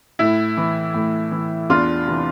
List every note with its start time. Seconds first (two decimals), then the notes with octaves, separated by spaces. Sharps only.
0.19 A2 E4
0.57 E3
0.94 A2
1.31 E3
1.70 E2 D4 F4
2.07 C3 E3